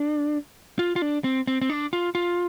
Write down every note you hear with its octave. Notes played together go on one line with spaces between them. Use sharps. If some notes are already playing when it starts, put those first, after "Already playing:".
Already playing: D4
F4
F4
D4
C4
C4
C4
D4
F4
F4